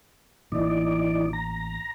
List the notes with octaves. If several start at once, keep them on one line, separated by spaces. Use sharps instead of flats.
A1 A#2 E3 D#4 D5
A#5